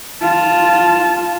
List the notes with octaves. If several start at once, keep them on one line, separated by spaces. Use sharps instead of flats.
F4 A5